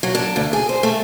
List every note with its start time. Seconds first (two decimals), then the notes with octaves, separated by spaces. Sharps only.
0.03 F#3
0.15 D4
0.36 D2
0.53 G#4
0.69 C5
0.83 A3